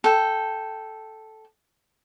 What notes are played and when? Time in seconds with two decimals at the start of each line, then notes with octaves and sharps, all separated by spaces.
0.04 A4 G5